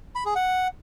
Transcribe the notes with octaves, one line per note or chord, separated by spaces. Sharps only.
B5
G#4
F#5